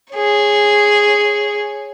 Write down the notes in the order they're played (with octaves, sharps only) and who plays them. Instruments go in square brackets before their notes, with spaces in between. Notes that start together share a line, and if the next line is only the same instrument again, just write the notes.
[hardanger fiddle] G#4 C#5